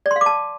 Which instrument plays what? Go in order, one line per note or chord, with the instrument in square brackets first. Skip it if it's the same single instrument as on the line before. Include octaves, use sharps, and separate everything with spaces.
[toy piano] D5
C6
F5
D6
A5